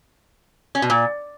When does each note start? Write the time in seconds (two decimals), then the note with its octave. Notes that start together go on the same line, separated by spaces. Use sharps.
0.75 C#4
0.82 B2
0.90 A#2